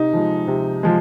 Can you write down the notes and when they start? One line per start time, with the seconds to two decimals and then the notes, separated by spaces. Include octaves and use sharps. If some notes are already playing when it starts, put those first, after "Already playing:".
Already playing: C3 D#4
0.13 F3 G#3
0.48 C3
0.83 F3 G#3